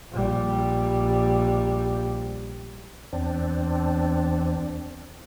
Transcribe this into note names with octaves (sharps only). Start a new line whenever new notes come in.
A#1 G3
E2 C4 D4